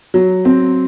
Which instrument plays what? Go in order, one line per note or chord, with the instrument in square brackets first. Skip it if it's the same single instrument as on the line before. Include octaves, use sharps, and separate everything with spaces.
[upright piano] F#3
C4